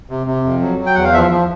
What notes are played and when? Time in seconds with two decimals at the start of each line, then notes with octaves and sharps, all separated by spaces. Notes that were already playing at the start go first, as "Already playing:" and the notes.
0.10 C3
0.27 C3
0.44 F2
0.61 F#3
0.79 F#3
0.86 G5
0.95 E2 F#5
1.04 F5
1.14 F3 E5
1.31 F3